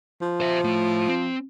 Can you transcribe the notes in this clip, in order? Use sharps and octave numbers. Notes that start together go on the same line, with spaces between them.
F3
C5 E5
A3 E4
C4